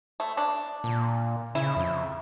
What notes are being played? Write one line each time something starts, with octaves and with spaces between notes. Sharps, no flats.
A3
D4
A#2
C#3 E4
F2